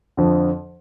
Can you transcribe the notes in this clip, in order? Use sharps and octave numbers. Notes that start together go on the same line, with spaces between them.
F2 D3 F3